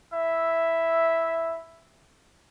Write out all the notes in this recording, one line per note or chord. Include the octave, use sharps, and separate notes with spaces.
E4 E5